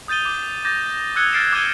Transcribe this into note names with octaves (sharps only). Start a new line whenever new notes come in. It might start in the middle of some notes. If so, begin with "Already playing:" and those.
D#6 G6 A6 D#7 G7
D6
D6 G6 A6 A#6
D#6 E6 F#6 G#6 C#7 G7
F6 A6 C7 D7 E7
D6 E6 F#6 G#6 D#7 G7